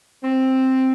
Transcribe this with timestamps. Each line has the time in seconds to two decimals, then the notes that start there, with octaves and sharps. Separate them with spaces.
0.23 C4